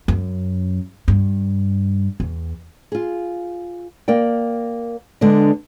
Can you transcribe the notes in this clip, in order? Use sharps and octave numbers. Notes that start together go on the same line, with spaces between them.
F#2
G2
E2
F4 G#4
A#3 A#4 D5 G5
D3 G#3 B3 D4